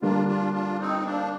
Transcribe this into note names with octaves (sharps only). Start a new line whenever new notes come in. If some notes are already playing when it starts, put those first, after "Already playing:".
D3 G3 A#3 D4 F4
D4 F4
D4 F4
C4 D#4
C4
A#3 D4